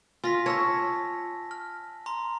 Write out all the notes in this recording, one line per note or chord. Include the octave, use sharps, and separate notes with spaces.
F4 G#5 A#6 B6
C#5 A5 E6 A#6
F6
A#5 C6